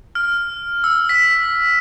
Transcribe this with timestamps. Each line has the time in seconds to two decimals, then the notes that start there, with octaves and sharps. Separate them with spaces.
0.15 F6
0.84 E6
1.09 B6